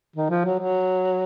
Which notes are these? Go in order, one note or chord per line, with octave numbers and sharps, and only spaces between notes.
D#3
F3
F#3
F#3